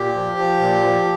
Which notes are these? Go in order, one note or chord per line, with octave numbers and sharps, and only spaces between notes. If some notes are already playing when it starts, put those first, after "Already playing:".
Already playing: A#2 G4
F3
F3
A#2
F3